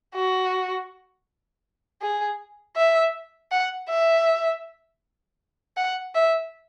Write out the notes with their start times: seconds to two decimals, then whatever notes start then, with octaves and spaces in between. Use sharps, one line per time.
0.15 F#4
2.01 G#4
2.76 E5
3.51 F#5
3.89 E5
5.77 F#5
6.14 E5